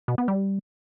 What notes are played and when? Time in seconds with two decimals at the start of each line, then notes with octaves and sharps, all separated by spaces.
0.08 B2
0.18 B3
0.28 G3